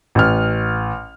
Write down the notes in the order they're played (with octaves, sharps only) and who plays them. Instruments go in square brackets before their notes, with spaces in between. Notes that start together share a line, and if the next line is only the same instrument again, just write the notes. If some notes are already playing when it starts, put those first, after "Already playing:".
[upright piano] A1 F6